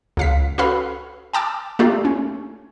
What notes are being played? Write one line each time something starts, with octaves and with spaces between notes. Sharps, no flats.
C#2 F5 B6
C#4 F#4 A4 B4 F5 B5
G5 A5 D6 E6
A3 A#3 D4 F4 G4
C#4